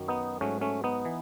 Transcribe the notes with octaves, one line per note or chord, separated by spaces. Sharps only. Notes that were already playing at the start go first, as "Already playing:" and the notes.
Already playing: F#2 D#3 F#3
B3 D#4
G#2 F#3 A3 C#4
A3 C#4
B3 D#4
E3